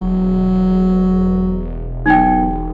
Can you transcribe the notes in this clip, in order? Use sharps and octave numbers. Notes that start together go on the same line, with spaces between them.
E1 F#3
B1 D#4 G5